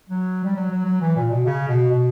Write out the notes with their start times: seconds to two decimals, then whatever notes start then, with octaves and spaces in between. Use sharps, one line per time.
0.10 F#3
0.44 G3
0.56 F#3
0.70 F#3
0.85 F#3
1.01 E3
1.16 A#2
1.31 B2
1.46 C#3
1.68 B2
1.91 B2